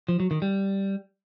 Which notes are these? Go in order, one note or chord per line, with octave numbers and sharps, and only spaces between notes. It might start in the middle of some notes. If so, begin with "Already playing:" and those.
F3
F#3
D#3
G3